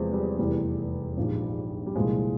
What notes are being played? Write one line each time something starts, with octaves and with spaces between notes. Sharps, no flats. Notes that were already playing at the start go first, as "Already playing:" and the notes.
Already playing: E2 C3 F3 G#3 C4
G3
F1 E2 E3 G3
A#1 G#2 F3
G3
C2 A#2 F3 G#3